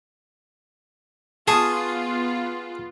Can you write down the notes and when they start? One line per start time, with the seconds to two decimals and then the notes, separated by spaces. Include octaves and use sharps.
1.48 B3 F4 G#4 A5 C#6 D#6